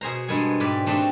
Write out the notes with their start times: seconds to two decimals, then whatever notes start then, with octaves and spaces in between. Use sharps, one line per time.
0.01 B2 G#4 C5 A#5
0.28 G2 G#3 B3 A4 G#5
0.60 G#2 G4 B4 D5
0.86 A3 C4 D4 D#4 F#4 G4